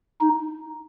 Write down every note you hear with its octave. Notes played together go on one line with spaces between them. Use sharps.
D#4